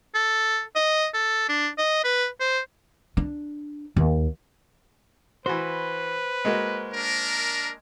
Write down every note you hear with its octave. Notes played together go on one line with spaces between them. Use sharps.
A4
D#5
A4
D4
D#5
B4
C5
D4
D#2
E3 F#4 B4 C5
G#3 A#3 F#4
D4 A#4